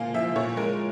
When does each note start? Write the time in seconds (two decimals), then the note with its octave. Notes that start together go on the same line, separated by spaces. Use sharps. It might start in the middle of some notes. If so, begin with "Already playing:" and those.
Already playing: A#2 A#3 F5 G#5
0.14 F3 E5
0.36 A#2 C#5
0.57 G#3 A#4